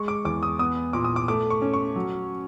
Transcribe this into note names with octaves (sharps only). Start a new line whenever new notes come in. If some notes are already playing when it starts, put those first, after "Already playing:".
Already playing: G#3 C#6
D6
E2 D6
D#6
B3 D#6
A#2 D6
D#6
D6
A3 D6
C#6
C#4
C#6
F#3